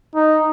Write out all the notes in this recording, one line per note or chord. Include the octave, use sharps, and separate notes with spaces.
D#4